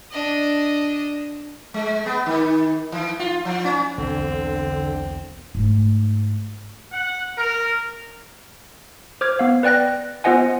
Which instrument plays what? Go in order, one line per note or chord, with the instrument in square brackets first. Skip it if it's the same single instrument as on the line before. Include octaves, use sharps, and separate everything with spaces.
[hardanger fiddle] D4 D#5
[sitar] G#3
B3
D#3
E3
F4
F3
C#4
[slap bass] B1 E2 E3 [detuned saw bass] D3 [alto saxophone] C4
[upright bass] G#2 A3
[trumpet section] F#5
A#4
[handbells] C5 D6 F6 G#6
B3 F5
B4 D5 G5 F#6 A#6
B3 F4 C5 D#5 F#5 G#5